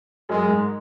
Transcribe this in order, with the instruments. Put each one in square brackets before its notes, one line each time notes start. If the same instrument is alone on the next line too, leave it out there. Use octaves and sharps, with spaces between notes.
[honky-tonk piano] F#2 F#3 [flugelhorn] G#3
[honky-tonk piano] G#2